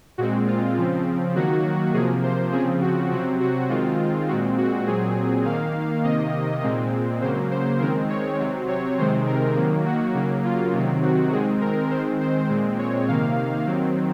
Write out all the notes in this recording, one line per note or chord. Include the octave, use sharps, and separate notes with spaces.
A#2 G#3 C4 F#4
F4
C#3 F3 C4
D#3 F#3 A#3 F#4
C3 F3 A#3 G#4
C5
C#3 F3 C4 G#4
F#4
C3 F#3 C4 F#4
F#4
D#3 G#3 C4 F4
A#2 G#3 C4 F#4
F#4
A#2 F#3 C4 G#4
D#3 A#3 F5
C3 D#3 A#3 D#5
A#2 G#3 C4
C#3 F#3 A#3 C5
C5
D#3 G#3 C4 A#4
C#5
C3 F#3 C4
C#5
C3 D#3 G#3 C4 C5
A#4
D#3 F#3 A#3
F#4
C#3 F#3 A#3
F4
C3 D#3 F#3 C4
F#4
D#3 G#3 C4 G#4
A#4
D#3 G#3 C4 C5
C5
A#2 G#3 C4
C#5
C3 D#3 A#3 F5
D#3 F#3 C4